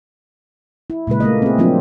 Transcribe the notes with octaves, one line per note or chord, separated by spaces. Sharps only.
E4
A#2 C#3 G#3 B4
A3 A#3 D#5
C4 G#4
F3 F#3 A#3 C4 D4 F4